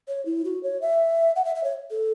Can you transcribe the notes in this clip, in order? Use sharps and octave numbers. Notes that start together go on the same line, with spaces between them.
C#5
E4
F#4
C#5
E5
F#5
E5
E5
C#5
A4